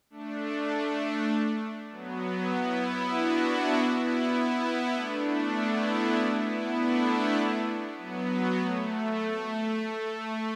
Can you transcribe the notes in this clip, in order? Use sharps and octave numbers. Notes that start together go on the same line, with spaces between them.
A3 D4
A3
F#3 B3
B3 E4
D4 F#4
B3 E4
B3 E4
B3 E4
A3 D4
B3 E4
D4 F#4
B3 E4
A3 D4
F#3 B3
A3
A3